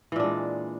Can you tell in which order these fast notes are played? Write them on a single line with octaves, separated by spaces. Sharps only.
E3 A#2 D4 G#3